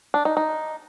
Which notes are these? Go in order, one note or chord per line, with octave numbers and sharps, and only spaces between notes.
D4
D#4
D#4